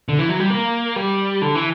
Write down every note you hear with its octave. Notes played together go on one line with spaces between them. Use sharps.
D3
E3
F#3
G3
A#3
G3
D3
E3